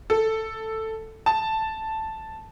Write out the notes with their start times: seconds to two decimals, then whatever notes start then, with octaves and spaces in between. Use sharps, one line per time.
0.10 A4
1.26 A5